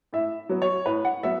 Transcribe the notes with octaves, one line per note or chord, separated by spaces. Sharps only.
A2 E5
F#3 B3
C#5
A2 B4
F#5
F#3 B3 E5